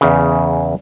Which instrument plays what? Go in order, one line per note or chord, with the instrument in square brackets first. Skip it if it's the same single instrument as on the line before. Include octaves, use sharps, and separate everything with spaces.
[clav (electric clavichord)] E2 C#3